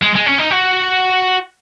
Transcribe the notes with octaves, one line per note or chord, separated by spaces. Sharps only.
G#3
G#3
C#4
D#4
F#4